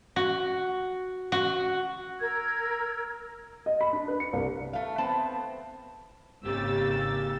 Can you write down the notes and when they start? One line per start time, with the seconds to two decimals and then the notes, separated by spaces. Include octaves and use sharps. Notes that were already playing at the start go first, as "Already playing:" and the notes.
0.16 F#4
1.32 F#4
2.20 A#4 E6 G#6
3.66 D#5
3.81 B5
3.93 D4
4.08 B4
4.20 C#7
4.33 C2
4.73 A3 F5
4.98 B3 C4 A5
6.44 G#1 C#3 A#3 G4 E6 A6